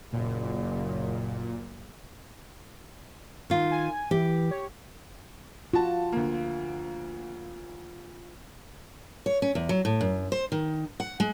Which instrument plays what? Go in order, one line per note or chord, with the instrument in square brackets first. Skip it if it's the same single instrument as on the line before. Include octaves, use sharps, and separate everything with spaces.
[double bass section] F#1 [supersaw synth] A#2
[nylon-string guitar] D#3 F4
[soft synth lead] G#5
[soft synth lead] E3 [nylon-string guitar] G4
[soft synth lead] C#5
[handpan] F4 [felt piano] F#4 A5
[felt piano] D2 A#3
[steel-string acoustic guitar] C#5
C#4
E2
F#3
A2
F#2
C5
D#3
F#5
G#3